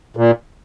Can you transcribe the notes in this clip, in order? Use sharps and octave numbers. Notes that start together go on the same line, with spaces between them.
A#2